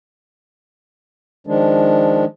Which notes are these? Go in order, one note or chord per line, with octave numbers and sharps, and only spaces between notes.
D#3 F3 G#3 D4